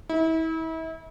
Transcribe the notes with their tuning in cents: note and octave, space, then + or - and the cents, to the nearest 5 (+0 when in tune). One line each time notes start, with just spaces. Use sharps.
E4 -35